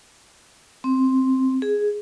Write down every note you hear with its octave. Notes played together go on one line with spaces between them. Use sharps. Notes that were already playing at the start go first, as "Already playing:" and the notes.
C4
G#4